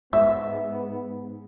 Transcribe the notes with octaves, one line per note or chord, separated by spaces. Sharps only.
G#2 B3 E5